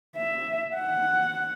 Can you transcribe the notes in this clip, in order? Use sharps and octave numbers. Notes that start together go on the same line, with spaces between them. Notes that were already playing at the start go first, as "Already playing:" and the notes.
E5
F#5